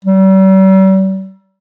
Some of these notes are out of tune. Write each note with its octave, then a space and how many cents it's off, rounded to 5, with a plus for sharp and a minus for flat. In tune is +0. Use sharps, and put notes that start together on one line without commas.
G3 -45